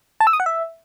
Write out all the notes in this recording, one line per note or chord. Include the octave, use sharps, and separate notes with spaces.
A5
E6
D#6
F#5
E5